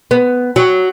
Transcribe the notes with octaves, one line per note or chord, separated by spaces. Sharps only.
B3
F#3